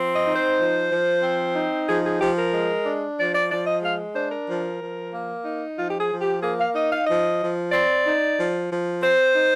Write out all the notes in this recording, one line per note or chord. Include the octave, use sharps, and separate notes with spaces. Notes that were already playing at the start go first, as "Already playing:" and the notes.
Already playing: F3 C4
D#5
D#4
C5
F3
F3
C4
D#4
F3 G#4
G#4
F3 G4
A#4
G#3
D4
F3 D5
D5
F3 D5
D#5
G#3 F5
D4 C5
A#4
F3
F3
A#3
D#4
F3 F4
G4
G#4
F3
G4
A#3 G#4
F5
D#4 D#5
F5
F3 D#5
F3
C4 D5
D#4
F3
F3
C4 C5
D#4